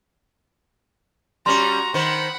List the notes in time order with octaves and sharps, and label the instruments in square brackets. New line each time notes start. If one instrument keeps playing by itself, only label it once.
[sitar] G3 C#4 [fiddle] F#4 A#5 [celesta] C6
[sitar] D#3 C5 [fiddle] F#5 B5